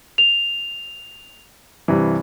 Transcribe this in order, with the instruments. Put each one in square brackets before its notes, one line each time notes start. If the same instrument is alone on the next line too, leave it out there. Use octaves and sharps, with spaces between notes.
[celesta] F7
[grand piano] G2 C3 E3